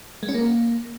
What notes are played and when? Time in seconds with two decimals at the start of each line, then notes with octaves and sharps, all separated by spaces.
0.23 G#3
0.29 C#4
0.34 A#3